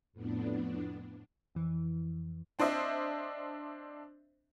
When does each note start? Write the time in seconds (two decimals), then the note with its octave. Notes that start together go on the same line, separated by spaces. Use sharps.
0.13 F2 A2 B3 D4
1.55 F2 E3
2.59 C4 D4 C5 D#5 E5